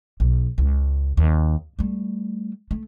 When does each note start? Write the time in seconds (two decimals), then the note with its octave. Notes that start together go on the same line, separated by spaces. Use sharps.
0.20 B1
0.58 C#2
1.17 D#2
1.79 G3 A3
2.71 A3